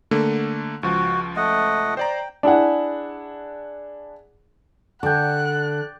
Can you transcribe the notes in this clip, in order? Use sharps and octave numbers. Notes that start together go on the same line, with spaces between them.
D3 A3 A#3
C#2 F3 F#4
A3 D#5 F#5
C5 D5 G5 A#5
D4 E4 G#4 F#5
D3 D5 F#5 G5 A5 F#6